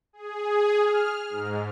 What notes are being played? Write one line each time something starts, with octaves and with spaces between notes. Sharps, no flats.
G#4
F6
G#2